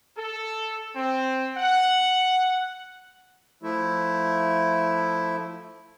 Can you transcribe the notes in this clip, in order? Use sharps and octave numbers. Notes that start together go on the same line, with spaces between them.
A4
C4
F#5
F3 A3 E4